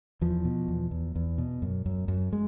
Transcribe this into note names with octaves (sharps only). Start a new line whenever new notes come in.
E2 F3
B2
E2
E2
E2
B2
F#2
F#2
F#2
G#3